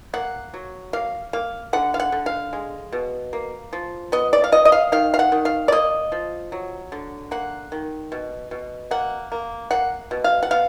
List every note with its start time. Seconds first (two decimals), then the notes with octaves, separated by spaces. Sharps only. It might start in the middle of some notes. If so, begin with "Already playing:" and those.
0.13 A#3 F#5
0.54 F#3
0.93 A#3 F5
1.33 A#3 F5
1.73 D3 F#5
1.94 F5
2.00 F#5
2.12 D3
2.26 F5
2.53 G#3
2.92 B2
3.33 A#3
3.73 F3
4.12 B3 D#5
4.33 D5
4.44 F5
4.52 B3 D#5
4.65 D#5
4.72 F5
4.92 D#3 F5
5.14 F5
5.19 F#5
5.32 D#3
5.45 F5
5.68 D5
5.72 A#3 D#5
6.12 F3
6.52 F#3
6.92 D3
7.31 A#3 F#5
7.72 D#3
8.12 B2
8.51 B2
8.91 A#3 F#5
9.32 A#3
9.71 A#3 F#5
10.11 B2
10.24 F5
10.43 F#5
10.51 B3 F5